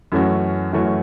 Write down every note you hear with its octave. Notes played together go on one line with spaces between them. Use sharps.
F#2 E3 A3 C#4 F#4
F#2 E3 A3 C#4 F#4